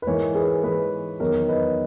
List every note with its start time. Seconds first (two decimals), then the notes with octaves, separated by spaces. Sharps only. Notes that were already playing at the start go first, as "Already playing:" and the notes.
0.02 B4
0.07 G#2 E3 A#4 C#5
0.35 G#4 B4
0.63 G#2 E3 G#4 B4
1.20 E2 D#3 F#3 A#4 C#5
1.48 B4 D#5